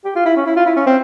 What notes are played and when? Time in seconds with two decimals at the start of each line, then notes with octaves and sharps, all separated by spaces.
0.05 G4
0.15 F4
0.25 E4
0.36 C#4
0.46 E4
0.56 F4
0.66 E4
0.76 C#4
0.86 C4